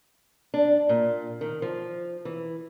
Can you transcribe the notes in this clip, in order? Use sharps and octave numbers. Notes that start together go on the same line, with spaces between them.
D4
A#2
D#3
F3
E3